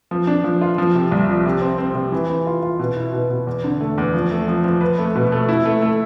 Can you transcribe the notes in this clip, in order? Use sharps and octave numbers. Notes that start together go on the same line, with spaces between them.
F3
D4
F3
F4
F3
C3
C2
F3
C3
C4
C4
C3
E3
E3
F4
F4
B2
E4
B2
B2
E2
D3
A3
E2
F3
A3
F3
F3
B4
A3
B2
A3
E4
A3
A3